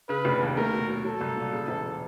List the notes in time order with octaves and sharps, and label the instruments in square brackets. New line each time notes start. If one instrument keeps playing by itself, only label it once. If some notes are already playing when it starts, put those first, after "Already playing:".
[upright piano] C#3 [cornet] B4
[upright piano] F1
D#2
[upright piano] A3 [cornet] A#4
[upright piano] B2
F#3
[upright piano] F#3 [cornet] A4
[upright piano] C2
A#2
C#3
E1